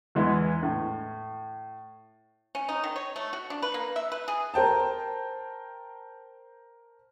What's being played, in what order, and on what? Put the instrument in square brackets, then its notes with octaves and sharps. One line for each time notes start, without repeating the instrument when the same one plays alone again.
[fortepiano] E2 E3 G#3 B3
A2
[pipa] C#4
D#4
D#3
C#5
A3
F#4
D4
B4
A#3
E5
B4
G#4
[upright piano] A#4 C5 G5 A5